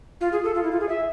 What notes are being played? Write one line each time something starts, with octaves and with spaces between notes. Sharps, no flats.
F4
G#4
A4
F4
E4
F4
G#4
E5